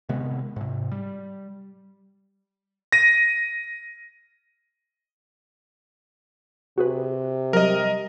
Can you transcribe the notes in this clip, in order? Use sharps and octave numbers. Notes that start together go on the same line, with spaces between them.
C3 D#3 G#3 B3
G#2 C3
G3
A#6 D#7
C3 F#4 G#4 B4
F#3 G3 G4 A#4 D#5